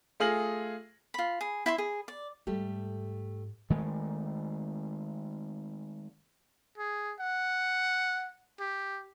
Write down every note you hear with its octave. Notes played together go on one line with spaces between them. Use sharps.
A3 F4 G#4 F6 A#6 F#7
F4 B5
G#4
E4 E5 C6
G#4
D5
G#2 G3 A3 G4
D#3 G#3 A3
G#4
F#5
G4